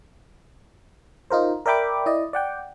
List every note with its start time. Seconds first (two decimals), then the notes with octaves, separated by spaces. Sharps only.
1.30 D#4 F4 A#4 C5
1.66 A#4 D5 E5 G5 B5 D6
2.06 E4 D5 D#5
2.33 D5 F#5 G5